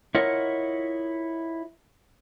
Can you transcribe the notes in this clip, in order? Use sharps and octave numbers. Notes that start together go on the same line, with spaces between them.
E4 F4 A#4 C#5 D#5 F#5